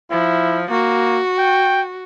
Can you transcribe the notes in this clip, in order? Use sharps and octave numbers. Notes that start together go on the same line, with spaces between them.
F3 E4
A#3 F#4
G5